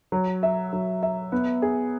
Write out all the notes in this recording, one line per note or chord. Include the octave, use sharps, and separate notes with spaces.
F#3
E5
F#3
E5
B3
G#4